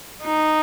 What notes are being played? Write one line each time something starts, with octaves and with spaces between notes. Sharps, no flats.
D#4